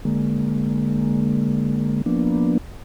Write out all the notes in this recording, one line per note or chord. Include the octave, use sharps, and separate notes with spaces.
D3 G#3 A#3
F3 A#3 B3 D4